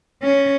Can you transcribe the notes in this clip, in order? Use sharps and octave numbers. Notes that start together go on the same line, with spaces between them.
C#4